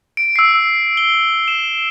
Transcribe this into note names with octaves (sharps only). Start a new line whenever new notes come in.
D7
E6 C7
G7
E7